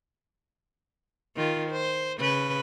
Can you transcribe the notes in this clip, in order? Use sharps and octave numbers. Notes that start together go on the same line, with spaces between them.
D#3 F4
C5
C#3 B4